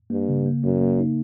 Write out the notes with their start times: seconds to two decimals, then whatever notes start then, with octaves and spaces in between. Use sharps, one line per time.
0.10 G2 A#3
0.29 C#3
0.46 A#3
0.63 F#2 A#3
0.81 A#3
0.99 D#4